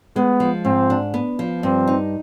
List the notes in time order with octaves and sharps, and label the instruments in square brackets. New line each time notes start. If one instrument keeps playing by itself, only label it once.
[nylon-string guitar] G#3 [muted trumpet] B3
[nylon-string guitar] F3
[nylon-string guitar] G#2 [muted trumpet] C4
[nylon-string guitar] D4
B3
F3
[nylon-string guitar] G2 [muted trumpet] C4
[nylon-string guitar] D#4